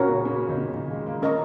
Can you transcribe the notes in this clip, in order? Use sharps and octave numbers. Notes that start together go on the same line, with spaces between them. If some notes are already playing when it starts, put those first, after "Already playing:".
Already playing: A#2 C#4 F#4 A#4 C#5 A#5
C#3
C#3
D#3
C#3
D#3
G#3
A#3
A#3 C#4 A#4 D#5 A#5 C#6